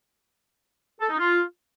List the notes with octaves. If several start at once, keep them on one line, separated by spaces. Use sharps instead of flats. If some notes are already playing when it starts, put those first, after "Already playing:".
A4
D#4
F4